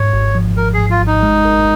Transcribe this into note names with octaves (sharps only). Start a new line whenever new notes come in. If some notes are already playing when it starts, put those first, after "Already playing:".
Already playing: G#2 C#5
G#1
F3
G#1 A#4
G#2 G#4
F4
G#1
D#4
G#3
A#4